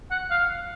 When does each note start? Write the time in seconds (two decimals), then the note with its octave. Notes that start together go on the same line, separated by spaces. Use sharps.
0.11 F#5
0.31 F5